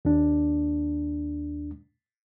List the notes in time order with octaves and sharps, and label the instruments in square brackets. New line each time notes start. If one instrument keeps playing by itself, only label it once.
[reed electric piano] D#2 D4